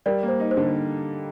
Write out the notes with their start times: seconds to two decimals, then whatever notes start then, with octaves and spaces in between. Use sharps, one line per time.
0.06 G3 A#4 D5
0.23 A#3
0.28 C5
0.40 D#4
0.51 C5
0.57 D3